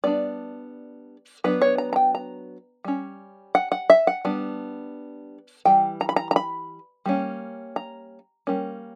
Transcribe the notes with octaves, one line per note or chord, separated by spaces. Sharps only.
G3 B3 D4 D5
F#3 B3 D4 B4
C#5
A#5
A#5
G5
A#5
G3 C#4
F#5
F#5
E5
F#5
G3 B3 D4
E3 G3 G5
A#5
B5
A#5
A#5
B5
G3 A#3 C#4
A#5
G3 A#3 C#4